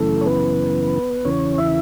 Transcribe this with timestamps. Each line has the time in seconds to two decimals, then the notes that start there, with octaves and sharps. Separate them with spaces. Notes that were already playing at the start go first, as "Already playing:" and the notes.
Already playing: F#2 C#3 E3 A3 A4
0.21 C#5
0.26 B3 B4
1.25 E2 C#3 E3 C#4 C#5
1.58 E4 E5